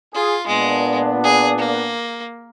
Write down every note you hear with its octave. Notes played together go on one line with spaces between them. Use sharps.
F4 G#4
A#2 G#3 B3 D4
G#4
A#3